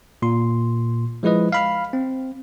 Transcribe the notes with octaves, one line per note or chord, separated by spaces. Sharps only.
A#2 C6
F3 G#3 E4 B4 D#5
F5 B5 F6
C4